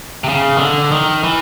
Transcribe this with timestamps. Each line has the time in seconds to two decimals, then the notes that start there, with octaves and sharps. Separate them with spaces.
0.24 C3
0.29 C#3
0.56 D#3
0.60 D3
0.92 D#3
1.24 E3